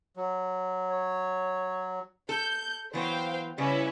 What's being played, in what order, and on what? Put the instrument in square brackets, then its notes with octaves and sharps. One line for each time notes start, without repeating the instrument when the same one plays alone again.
[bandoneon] F#3
[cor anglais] C#5
[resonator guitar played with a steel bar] A4 [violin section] G6
[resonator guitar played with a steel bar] E3 F#3 B3 [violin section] C5 F5 G5
[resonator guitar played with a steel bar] C#3 G3 [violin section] C#4 E4 B4